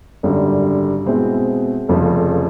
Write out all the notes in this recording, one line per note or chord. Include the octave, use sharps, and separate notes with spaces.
G#1 F#2 D3 G3
B2 G#3 C4 E4
F1 F2 C#3 F3